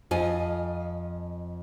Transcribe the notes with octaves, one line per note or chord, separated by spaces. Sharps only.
F2 F4 D#5 G#5